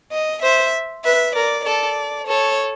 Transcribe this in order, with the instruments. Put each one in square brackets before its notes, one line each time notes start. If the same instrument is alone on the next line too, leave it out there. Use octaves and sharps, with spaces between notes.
[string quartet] D#5
[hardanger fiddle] C5 [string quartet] E5
[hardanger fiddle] B4 [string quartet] E5
[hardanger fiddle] A#4 [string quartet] D5
[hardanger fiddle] A4 [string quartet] D5
[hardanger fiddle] A4 [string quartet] C#5